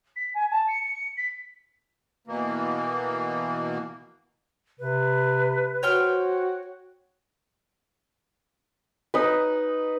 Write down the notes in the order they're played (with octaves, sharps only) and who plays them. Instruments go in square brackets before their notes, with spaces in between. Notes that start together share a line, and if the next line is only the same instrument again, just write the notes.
[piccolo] B6
G#5
A5
C#7
C#7
B6
[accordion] B2 E3 A#3
[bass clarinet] C3 [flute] B4
[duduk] F#4 [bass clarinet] C5 [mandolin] C#5 G5 F6
[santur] D#4 B4